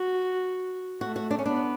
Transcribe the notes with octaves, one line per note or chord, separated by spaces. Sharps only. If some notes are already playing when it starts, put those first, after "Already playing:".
Already playing: F#4
A3 F#4
F#4
D4
C#4
B3 D4